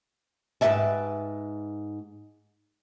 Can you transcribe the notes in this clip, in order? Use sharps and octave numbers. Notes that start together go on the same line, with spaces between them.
G#2 G4 B4 D5 E5 A5